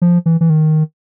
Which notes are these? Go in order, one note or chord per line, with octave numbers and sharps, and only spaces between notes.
F3
E3
E3
D#3